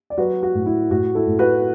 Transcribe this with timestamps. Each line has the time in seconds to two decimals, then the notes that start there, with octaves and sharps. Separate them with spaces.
0.10 D5
0.18 F#3 F#4 B4
0.43 F#4
0.54 A2
0.66 E4
0.91 A2 F#4
1.15 E4 A4
1.27 A2
1.39 F#4 B4